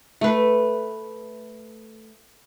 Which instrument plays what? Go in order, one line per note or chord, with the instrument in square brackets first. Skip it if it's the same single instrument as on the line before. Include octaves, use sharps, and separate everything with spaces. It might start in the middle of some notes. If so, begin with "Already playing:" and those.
[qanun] A3 B4